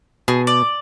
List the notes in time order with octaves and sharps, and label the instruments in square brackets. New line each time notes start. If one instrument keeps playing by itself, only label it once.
[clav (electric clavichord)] B2 [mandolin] G#4
[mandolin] D5